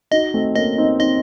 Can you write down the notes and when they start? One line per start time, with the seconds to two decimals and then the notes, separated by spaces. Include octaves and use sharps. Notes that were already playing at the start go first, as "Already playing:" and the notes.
0.11 D#4 F#4 D#5
0.34 A3 C4
0.55 A#3 C#4 D#5
0.78 C4 D#4
0.99 C4 D#4 D#5